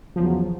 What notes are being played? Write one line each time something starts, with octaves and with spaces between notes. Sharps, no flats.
E2 C#3 F3 F#3